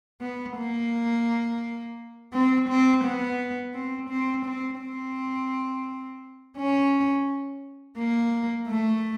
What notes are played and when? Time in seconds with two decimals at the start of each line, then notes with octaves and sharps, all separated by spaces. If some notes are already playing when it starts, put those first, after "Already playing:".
0.21 B3
0.57 A#3
2.33 C4
2.69 C4
3.04 B3
3.74 C4
4.09 C4
4.45 C4
4.80 C4
6.57 C#4
7.98 A#3
8.68 A3